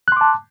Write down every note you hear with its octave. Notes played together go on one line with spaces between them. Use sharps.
A5 C6 D6 F#6